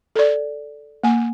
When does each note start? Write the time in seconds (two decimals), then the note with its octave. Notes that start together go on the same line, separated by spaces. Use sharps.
0.16 A4 D5
1.04 A#3 G#5